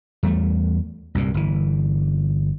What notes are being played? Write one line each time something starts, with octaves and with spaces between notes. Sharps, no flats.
E2 G3 A3
C2 G2 A#2
G1 E3